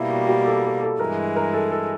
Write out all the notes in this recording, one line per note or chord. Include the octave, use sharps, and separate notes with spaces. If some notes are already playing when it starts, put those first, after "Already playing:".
Already playing: B2 G3 A#3 E4
F#4
G4
A4
A4
A4
G2 E3 G#3 A#4
A#4
A4
A4